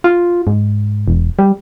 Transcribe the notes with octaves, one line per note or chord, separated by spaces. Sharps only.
F4
G#2
E1
G3